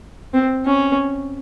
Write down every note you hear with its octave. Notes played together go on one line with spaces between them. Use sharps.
C4
C#4